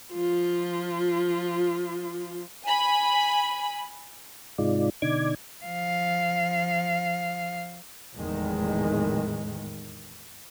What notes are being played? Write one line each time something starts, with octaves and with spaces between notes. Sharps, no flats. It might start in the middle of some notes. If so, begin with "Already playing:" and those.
F3 F4
G#5 B5
G#2 C3 G#3 D#4 F4 D5
B2 D3 D#4 D5 D6 G#6
F3 F5
F1 E2 A2 D#3 G#3